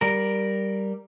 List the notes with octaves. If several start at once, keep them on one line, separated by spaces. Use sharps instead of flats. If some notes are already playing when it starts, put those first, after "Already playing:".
G3 A#4